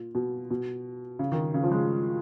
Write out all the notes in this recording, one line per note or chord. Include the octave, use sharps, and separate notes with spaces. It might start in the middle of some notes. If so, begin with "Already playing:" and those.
Already playing: A#2
B2
B2
C#3
D#3
C#3
F3
G#3